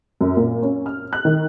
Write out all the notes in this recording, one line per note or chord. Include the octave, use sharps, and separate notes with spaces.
F#2
A#2
C#4
F6
F#6
D#3